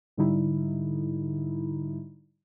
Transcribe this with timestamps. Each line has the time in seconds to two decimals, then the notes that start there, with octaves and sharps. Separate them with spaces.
0.17 G#2 D3 G3 D#4 E4